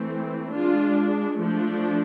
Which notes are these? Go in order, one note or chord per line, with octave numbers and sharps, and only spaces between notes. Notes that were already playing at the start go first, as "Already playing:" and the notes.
Already playing: E3 A3 C4
G#3 D4 F4
F3 A3 D4